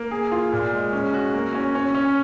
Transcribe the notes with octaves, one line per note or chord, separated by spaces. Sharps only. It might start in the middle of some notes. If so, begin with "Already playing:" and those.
Already playing: A#3
G#4
F4
A#2
G#3
C#4
F#4
A#3
C#4
C#4
C#4